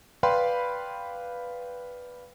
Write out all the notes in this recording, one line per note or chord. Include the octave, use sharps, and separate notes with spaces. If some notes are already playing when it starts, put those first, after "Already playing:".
B4 D5 F5 G5 B5 C6